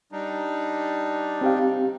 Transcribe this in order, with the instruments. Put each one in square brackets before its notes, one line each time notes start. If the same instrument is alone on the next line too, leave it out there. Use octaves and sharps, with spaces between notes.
[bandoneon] G3 D4 D#4
[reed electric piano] C4 G4 F5